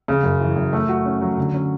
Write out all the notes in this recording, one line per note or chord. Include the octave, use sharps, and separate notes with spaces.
C#3
F#2
E3
F#2
A3
F#4
C#4
F#3
D3
C#4